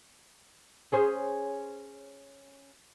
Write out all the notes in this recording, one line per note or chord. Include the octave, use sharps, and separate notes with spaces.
C#4 G#4 C5